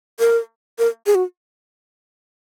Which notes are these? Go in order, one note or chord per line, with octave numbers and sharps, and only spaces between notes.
A#4
A#4
G#4
F#4